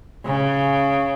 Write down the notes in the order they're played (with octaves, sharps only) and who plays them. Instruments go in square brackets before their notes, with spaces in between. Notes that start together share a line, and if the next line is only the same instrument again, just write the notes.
[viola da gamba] C#3